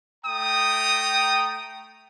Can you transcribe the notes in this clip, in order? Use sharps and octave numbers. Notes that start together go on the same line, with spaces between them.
A3 G5 A#5 D#6